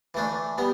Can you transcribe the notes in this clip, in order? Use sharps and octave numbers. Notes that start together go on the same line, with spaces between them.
E3 A3 D4
G3 B3